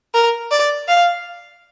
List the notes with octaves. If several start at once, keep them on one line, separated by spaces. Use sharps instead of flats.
A#4
D5
F5